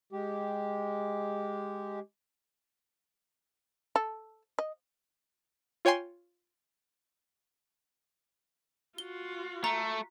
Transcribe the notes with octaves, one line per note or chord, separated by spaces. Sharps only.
G#3 G4
A4
D#5
F4 C#5 G5 G#5 C6
F4 F#4 G7
A3 A#5